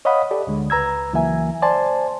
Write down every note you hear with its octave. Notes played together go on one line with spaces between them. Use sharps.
C#5 D#5 F5 F#5 B5 D#6
G4 A4 D5
D2 D3 G#3
C#2 B4 A#5 E6 G#6
C#2 E3 F#3 A#3 E5 G#5
C5 D5 G#5 A5 C6